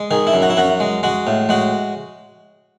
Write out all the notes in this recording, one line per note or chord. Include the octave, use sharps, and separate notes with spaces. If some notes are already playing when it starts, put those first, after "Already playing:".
Already playing: G#3
D#3 G#4
E4
F#2
F#4
E4
F#2 F#4
G#3
G#3 F#4
A2
G#3 F#4